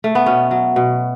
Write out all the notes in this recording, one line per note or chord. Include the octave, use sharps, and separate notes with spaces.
A3
B3
B2 C#4
F#3
B2